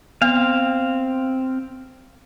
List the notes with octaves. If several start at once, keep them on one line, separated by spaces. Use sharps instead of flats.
B3 C4 F5